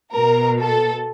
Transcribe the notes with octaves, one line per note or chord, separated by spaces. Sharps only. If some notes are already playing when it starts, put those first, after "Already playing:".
B2 A#4
A4